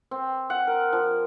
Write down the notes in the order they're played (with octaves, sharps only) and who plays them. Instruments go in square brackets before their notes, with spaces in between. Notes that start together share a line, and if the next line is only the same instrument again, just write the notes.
[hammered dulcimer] C4
F#5
A#4
F3